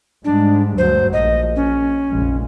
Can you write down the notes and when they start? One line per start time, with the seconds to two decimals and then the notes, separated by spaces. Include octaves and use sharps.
0.25 G#2 G3 G#3 D4
0.78 D2 G2 F#3 C5
1.13 A#1 D#5
1.56 C#4
2.10 F1 A#1 G#3